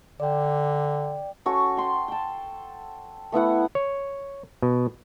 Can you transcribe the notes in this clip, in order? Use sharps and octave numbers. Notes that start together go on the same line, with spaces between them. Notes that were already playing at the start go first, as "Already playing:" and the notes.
D3 D5 G5
C#4 F#4 A4 C#6
G5 C6
G5 A5
A3 B3 E4 F#5
C#5
B2